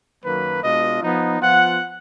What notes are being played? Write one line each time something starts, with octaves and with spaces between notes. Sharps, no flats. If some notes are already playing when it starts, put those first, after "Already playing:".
F#2 D#3 F#3 A#3 B4
B2 G#3 D4 F4 D#5
F3 B3 D#4
F3 B3 F4 F#5